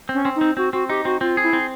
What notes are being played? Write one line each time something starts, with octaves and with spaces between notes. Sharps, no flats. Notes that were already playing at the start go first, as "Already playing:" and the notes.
C4
C#4
C4
D#4
C4
C4 F#4
C4 F#4
D#4 G4
C4 F#4
C4 F4
G#4
E4
C4